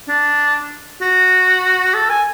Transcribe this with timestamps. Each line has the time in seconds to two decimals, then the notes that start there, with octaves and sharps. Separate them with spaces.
0.08 D4
1.02 F#4
1.94 A4
2.10 G#5